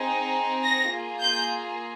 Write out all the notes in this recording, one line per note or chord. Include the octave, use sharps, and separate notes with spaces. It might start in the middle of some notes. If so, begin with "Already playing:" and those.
Already playing: C4 D#4 G#4
A#6
A#3 F4 G#4
G6